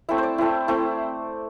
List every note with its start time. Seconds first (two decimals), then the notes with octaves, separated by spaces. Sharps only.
0.09 A3 C4 E4 E5
0.18 C5 D5
0.38 A3 C4 E4
0.68 A3 C4 E4 C5